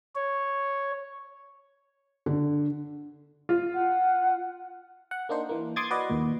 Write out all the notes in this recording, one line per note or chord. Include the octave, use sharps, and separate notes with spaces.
C#5
D3
F4
F#5
F#5
A#3 D4 D#4 C5
E3 A#3
C6 D6 D#6 G#6 A6
F#4 B4 D5 D#5
D#2 A#2